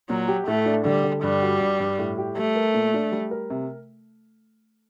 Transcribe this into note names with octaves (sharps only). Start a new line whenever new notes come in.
A#2 F#3
G4
A2 A3
D4
D3 G3
D3
G2 G3
F#4
G2
G2
A2
G4
G3 A3
A#4
A#2
D4
G3
A#4
C3